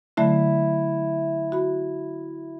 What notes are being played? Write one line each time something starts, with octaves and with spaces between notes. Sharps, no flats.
D3 F#3 A3 E4
F#4 B5